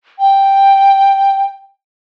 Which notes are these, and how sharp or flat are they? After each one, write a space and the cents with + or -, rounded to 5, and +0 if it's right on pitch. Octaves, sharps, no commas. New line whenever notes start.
G5 +0